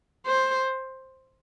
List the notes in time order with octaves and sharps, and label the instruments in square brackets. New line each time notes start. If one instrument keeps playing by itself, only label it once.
[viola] C5